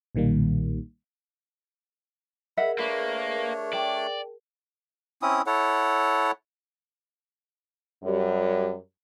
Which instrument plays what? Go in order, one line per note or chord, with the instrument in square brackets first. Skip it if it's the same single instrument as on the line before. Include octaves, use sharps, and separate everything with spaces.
[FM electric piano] B1 A#2 D#3 G3 A#3
[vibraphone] G#4 A#4 [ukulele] D#5 E5 F#5 [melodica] B5
[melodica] A3 D4 C#5 [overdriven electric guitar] A#3 [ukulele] B4
[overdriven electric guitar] D5 [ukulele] G5 A5
[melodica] C4 C#4 E4 D#6
E4 A4 C#5 F#5
[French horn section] F#2 G3